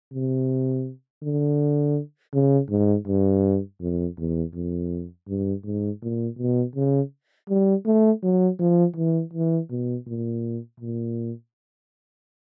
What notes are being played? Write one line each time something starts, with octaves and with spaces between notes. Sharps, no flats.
C3
D3
C#3
G#2
G2
F2
E2
F2
G2
G#2
A#2
B2
C#3
G3
A3
F#3
F3
E3
E3
B2
A#2
A#2